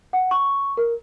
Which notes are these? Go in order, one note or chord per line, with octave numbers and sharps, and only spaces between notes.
F#5
C#6
A#4